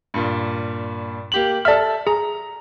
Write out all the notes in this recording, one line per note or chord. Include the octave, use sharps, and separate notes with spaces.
G2 A#2
A#3 G4 F#7
A4 D5 E5 F6
G#4 A#5